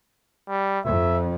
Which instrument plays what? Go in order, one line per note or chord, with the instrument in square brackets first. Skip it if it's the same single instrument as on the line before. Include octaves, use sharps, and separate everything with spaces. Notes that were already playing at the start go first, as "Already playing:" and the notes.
[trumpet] G3
[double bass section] F2 [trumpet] E5